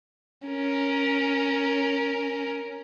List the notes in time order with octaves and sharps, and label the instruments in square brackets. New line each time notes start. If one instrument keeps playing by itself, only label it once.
[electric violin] C#4 A#4